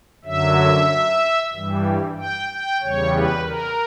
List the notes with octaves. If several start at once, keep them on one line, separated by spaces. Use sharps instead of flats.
F#2 D3 F#3 E5
G2 E3 G3
G5
G5
E2 C#3 G3 C#5
B4
A#4